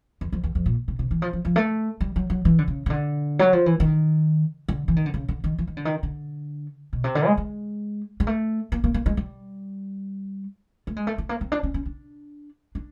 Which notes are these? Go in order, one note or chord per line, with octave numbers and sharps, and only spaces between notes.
E2
F2
E2
F2
A#2
C3
C3
E3
F3
F3
F3
A3
G3
F#3
F#3
E3
D3
C#3
C#3
D3
F#3
F3
E3
D#3
D3
E3
D#3
D3
C#3
D3
D#3
E3
D#3
D3
D#3
D3
B2
C3
D3
G#3
G#3
G#3
A3
A#3
A#3
A#3
G#3
G3
A3
G#3
A3
A3
A#3
C4
D4
C#4
C#4
D4
D4